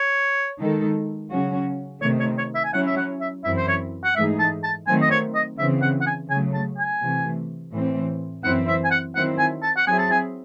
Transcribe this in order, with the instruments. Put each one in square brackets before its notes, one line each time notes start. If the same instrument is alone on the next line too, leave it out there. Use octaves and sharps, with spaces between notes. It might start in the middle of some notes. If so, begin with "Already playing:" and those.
Already playing: [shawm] C#5
[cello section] D#3 G#3 D#4 A4
C#3 F#3 C#4 F#4
[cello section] C3 D#3 A3 [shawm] C#5
[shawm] C#5
C#5
E5
G#5
[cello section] F#3 C#4 E4 [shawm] F#5
[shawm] E5
F#5
E5
[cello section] F#2 E3 C4 E4 [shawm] E5
[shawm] C5
C#5
F#5
[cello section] G#2 E3 A3 D#4 G#4 [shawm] E5
[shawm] A5
A5
[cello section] D#3 F#3 A3 C4 [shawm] G#5
[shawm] D#5
C#5
D#5
[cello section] C#3 E3 C4 [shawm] E5
[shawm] F#5
F#5
G#5
[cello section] C#3 F#3 A3 [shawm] G#5
[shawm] A5
G#5
[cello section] C3 E3 A3
A2 E3 C4
[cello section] F#2 E3 C4 E4 [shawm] F#5
[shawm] E5
G#5
F#5
[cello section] D#3 F#3 C4 E4 [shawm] F#5
[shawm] G#5
A5
F#5
[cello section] F#3 C4 E4 G#4 [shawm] G#5
[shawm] A5
G#5